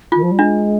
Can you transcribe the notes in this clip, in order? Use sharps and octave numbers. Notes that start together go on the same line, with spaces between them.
D#3 F4
F3
G3
G#3 D4